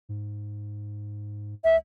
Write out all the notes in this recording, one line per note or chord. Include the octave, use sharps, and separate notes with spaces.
G#2
C#2 E5